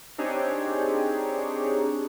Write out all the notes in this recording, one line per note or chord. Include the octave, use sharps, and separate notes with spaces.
C4 D4 D#4 G4 G#4 C#5